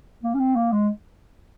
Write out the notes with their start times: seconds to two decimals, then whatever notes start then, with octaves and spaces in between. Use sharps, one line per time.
0.24 A#3
0.35 C#4
0.40 C4
0.56 A#3
0.72 G#3